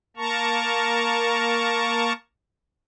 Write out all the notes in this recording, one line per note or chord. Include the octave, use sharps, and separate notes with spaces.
A#3 A#4 A5 A#5 C#6